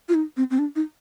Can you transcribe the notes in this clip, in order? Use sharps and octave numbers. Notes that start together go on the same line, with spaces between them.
F4
D#4
C4
C4
D4
D#4